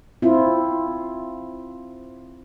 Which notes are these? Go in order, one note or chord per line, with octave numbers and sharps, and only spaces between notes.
C4 E4 F4